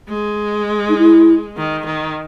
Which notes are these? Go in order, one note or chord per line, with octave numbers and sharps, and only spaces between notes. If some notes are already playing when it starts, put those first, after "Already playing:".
G#3
D#4
E4
D#3
D#3